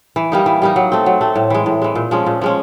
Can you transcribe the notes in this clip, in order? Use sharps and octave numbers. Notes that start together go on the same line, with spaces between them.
E3
G3 A#3 D#4
E3
G3 A#3 D#4
F#3
A3 C4
F#3
A3 C4
A2
E3 G#3
A2
E3 G#3
A#2
F3 G#3 C#4
A#2
F3 G#3 C#4